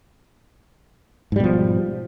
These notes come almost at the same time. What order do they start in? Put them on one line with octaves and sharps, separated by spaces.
G#2 G3 B2 F3